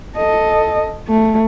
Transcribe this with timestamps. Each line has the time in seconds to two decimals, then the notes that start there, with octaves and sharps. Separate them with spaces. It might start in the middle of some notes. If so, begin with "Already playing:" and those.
0.17 A4 D#5
1.08 A3